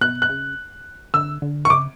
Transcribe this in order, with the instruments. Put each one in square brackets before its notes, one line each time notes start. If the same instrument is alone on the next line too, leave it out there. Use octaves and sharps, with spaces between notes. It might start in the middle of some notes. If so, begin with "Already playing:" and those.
[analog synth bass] B2 [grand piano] F#6
[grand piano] F#6
[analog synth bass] C#3
[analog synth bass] D3 [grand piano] E6
[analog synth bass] D3
[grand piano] C#6
[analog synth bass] C#3 [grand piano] D6